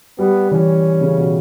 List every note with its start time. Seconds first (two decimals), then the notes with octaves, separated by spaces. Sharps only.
0.18 G3 B3
0.51 E3 C#4
1.01 C#3
1.17 B2